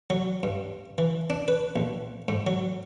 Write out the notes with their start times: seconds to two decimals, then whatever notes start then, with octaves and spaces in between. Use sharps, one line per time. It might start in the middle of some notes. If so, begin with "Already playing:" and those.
0.10 F#3
0.43 G2
0.98 E3
1.30 D4
1.48 B4
1.76 A#1
2.28 G#2
2.47 F#3